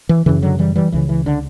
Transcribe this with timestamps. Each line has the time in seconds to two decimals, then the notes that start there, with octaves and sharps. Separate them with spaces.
0.09 E3
0.26 F#2 C#3 E3
0.42 D3 F#3
0.59 E3 G3
0.76 E3 G3
0.92 C#2 C#3 E3
1.09 E3
1.26 D3